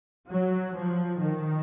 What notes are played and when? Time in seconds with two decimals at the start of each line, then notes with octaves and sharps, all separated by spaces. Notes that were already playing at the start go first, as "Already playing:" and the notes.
0.27 F#3
0.74 F3
1.19 D#3